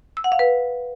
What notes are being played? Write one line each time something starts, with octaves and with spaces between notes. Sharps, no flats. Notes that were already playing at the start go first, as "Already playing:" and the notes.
E6
F#5
F5
B4